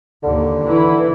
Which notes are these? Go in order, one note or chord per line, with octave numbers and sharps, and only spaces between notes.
D#2 D3
E3 E4